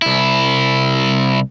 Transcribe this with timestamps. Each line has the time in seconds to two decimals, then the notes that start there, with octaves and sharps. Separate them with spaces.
0.02 C2 E4